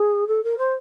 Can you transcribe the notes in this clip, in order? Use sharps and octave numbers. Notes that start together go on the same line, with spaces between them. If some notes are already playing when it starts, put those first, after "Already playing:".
Already playing: G#4
A4
A#4
C5